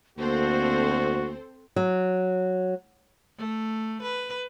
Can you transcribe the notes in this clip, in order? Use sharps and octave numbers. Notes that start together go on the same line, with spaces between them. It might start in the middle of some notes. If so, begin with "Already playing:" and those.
D2 A#3 C4 F#4 A4 C5
F#3
A3
B4